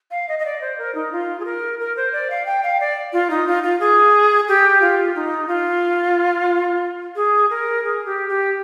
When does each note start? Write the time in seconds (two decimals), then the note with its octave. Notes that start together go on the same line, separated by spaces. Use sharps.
0.11 F5
0.29 D#5
0.39 D#5
0.45 D5
0.61 C5
0.78 A#4
0.95 D#4
1.12 F4
1.40 G#4
1.45 A#4
1.80 A#4
1.97 C5
2.13 D5
2.30 F5
2.46 G5
2.63 F5
2.80 D5
3.13 F4
3.30 D#4
3.47 F4
3.63 F4
3.80 G#4
4.48 G4
4.81 F4
5.15 D#4
5.48 F4
7.16 G#4
7.50 A#4
7.84 G#4
8.05 G4
8.29 G4